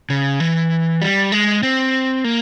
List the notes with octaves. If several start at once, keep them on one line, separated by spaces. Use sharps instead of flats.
C#3
E3
G3
G#3
C4
A#3